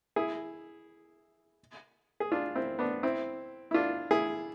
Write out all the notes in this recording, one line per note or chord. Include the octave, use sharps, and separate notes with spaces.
E4 G#4
G#4
D4 F4
C4 E4
B3 D4
C4 E4
E4
D4 F4
E4 G#4